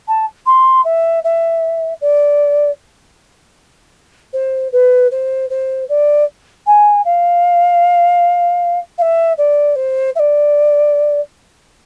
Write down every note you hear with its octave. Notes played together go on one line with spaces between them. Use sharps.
A5
C6
E5
E5
D5
C5
B4
C5
C5
D5
G#5
F5
F5
E5
D5
C5
E5
D5